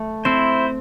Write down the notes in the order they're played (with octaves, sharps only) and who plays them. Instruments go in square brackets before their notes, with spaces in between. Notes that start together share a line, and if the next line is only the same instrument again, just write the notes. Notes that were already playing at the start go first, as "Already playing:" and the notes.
Already playing: [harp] A3
[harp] C4 [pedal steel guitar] E4 C5